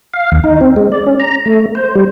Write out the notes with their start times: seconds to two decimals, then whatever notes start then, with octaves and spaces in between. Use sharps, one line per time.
0.14 F5
0.32 D#2
0.44 D#4
0.61 C4
0.76 G#3
0.92 D5
1.06 C#4
1.19 A#5
1.46 A3
1.75 C5
1.96 G3